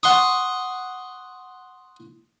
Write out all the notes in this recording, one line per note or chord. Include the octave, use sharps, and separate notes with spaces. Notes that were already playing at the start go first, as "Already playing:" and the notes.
F#5 C6 C#6 D#6